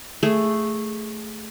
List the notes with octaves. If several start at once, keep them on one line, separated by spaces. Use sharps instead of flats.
A3 G#4